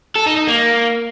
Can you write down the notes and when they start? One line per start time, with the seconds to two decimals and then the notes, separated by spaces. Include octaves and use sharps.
0.15 A4
0.26 D#4
0.37 D#4
0.47 A#3